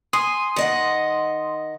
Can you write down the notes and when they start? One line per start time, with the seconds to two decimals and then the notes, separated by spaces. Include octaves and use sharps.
0.13 G#5 C6 D#6
0.56 D#3 D#5 F#5